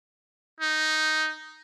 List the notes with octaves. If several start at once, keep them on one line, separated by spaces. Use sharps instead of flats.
D#4